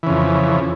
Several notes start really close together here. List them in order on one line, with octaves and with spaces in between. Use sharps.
E3 C#3 F2